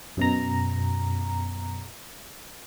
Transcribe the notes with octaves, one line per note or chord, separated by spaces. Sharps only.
F#2 B2 A#5